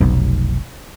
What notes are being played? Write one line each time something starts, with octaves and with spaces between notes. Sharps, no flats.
F1 B1